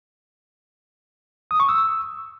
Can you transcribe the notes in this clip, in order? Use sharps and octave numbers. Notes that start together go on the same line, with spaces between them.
D#6
C#6
E6